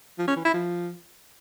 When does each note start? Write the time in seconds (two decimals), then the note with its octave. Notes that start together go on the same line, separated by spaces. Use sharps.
0.19 F3
0.28 C#4
0.36 E3
0.45 E4
0.54 F3